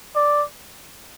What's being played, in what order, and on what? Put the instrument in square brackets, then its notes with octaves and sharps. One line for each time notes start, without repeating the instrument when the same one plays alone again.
[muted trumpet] D5